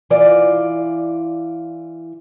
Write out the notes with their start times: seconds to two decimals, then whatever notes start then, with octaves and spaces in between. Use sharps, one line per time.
0.10 E3 F4 D5